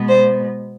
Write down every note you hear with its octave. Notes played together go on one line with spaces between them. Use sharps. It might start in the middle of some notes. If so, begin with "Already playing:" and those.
Already playing: B2 G#3 B3
C5